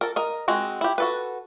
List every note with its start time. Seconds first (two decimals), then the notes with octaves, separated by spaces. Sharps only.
0.01 A4 A#4
0.16 A#4 D#5
0.48 G#3 C4 F#4
0.81 E4 G4
0.98 F#4 A4 B4